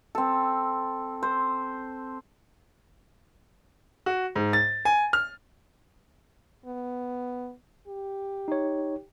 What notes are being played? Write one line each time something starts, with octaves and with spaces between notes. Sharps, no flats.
C4 A4
C5
F#4
G#2
A6
G#5
F6
B3
G4
D#4 C#5